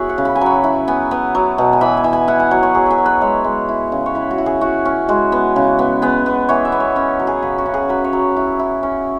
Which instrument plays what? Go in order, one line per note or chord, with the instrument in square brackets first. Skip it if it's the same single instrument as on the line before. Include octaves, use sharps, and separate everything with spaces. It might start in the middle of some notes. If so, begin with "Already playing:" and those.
Already playing: [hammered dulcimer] B3 E4 F#4 G#4 B4 C#5
F#5
C#3
B5
G#5
F#3 B5
E4
B3 G#5
B3
F#3
B2
G#5
E3 B5
G#5
E3
G#5
E4 F#5
G#5
F#3 F#5
C#5
F#3 G#4
G#4 B4
F#3
B4
G#3 C#5
G#3
E4
C#3
C#5
E4 B4
F#4
E4
G#4
E4 F#4
C#4
G#3 F#4
B3
C#3
B3
B3 G#4
B3
E3 C#5
E5
B3
C#5
C#4 C#5
F#3
G#4
C#3 B4
F#4
C#3
G#4
F#3 B4
C#5
F#3
E4
E4
C#4